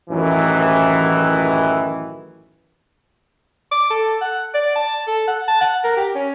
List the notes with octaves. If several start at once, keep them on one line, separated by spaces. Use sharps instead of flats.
A1 F#2 D#3 E3
D6
A4
F#5
D5
A5
A4
F#5
A5
F#5
A#4
G4
C#4